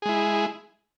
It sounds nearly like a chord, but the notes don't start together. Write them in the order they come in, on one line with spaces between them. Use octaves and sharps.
G#4 G#3 E4